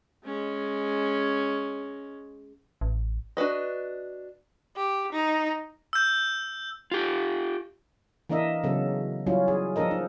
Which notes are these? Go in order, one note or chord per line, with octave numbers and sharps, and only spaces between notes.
G#3 C#4
A1
D4 F#4 B4 D#5
G4
D#4
E6 G6
F4 G4
E3 A#3 D4 A#4 D#5 E5
C#3 F#3 B3 A4
F#3 G3 C#4 E4 F4
G#4
F3 A#3 D4 A4 A#4 D#5
D#4